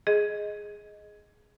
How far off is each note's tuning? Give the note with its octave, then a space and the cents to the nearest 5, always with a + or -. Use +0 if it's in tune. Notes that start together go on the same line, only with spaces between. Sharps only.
G#4 +5 D#5 +0